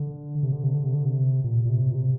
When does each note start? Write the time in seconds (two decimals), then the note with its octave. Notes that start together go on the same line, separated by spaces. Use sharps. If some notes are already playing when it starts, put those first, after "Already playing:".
Already playing: D3
0.43 C3
0.53 D3
0.64 C3
0.74 D3
0.85 C3
0.94 D3
1.05 C3
1.44 A#2
1.65 A#2
1.69 C3
1.92 A#2
1.95 C3